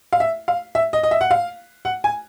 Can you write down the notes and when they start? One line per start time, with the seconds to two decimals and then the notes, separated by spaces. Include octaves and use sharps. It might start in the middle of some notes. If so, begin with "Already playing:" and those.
0.13 F5
0.20 E5
0.48 F5
0.75 E5
0.93 D#5
1.03 D#5
1.11 E5
1.21 F#5
1.31 F5
1.85 F#5
2.04 G#5